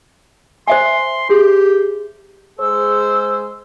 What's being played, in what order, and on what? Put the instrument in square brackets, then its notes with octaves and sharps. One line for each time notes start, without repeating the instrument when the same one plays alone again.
[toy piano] C5 E5 G#5 [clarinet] C6
[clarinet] G4 [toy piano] G#4
[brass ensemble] G#3 G#4 C5 [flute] E6